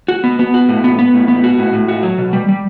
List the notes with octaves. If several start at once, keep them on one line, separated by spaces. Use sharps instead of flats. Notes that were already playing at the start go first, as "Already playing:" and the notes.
F#4
B3
B3
F#4
A2
B3
B3
A2
B3
F#4
A2
A2
F#4
F#3
B2
G3
G3